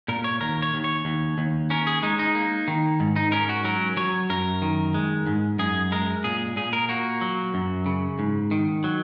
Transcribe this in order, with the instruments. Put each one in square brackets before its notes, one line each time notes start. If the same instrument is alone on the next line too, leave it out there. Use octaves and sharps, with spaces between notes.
[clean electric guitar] A#2 A#4
C#5
D#2 A#4
C#5
D#2
C#5
D#2
D#2
C#4 A#4
G#4
G#3 D#4
D#4
A#3
D#3
G#2
D#4
C#4 A#4
F#4
F#3 A#4
F#3 C#5
F#2 A#4
D#3
G#3
G#2
F#2 G#4
G#3 A#4
A#2 G#4
A#2 G#4
A#4
A#3 F#4
F#3
F#2
C#3
G#2
D#3
F#3